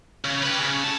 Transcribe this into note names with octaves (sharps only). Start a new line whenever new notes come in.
C#3
G4 B4
C#3
A2 A5